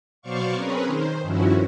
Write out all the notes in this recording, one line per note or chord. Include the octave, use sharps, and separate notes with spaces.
B2 F#3 C5 D5 F5 C#6
C4 C#4 G#4 A#4 B4 C#5
D#3 C5
G2 D#3 F3 C#4 E4 F#4